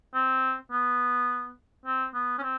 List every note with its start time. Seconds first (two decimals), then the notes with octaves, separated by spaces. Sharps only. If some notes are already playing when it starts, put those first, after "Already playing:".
0.14 C4
0.71 B3
1.86 C4
2.14 B3
2.38 C#4
2.42 C4